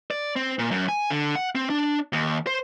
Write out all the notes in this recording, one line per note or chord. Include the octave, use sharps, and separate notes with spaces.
D5
C4
A#2
F#2
G#5
D3
F#5
C4
D4
D#2
C5